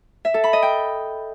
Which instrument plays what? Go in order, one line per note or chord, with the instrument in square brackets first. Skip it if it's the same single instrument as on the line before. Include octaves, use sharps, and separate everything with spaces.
[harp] E5
A4
B5
D#5
G5